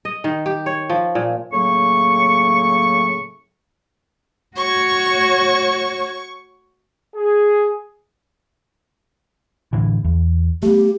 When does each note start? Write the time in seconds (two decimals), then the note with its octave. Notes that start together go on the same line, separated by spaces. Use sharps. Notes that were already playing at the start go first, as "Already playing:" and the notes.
0.05 D#5
0.24 D#3
0.46 G4
0.66 C#5
0.90 F3
1.15 A#2
1.52 A2 C#3 F#3 A#3 C#6
4.57 F#4 C#5 C#6
7.15 G#4
9.73 A2 D3 E3
10.04 E2
10.63 A3 B3 G4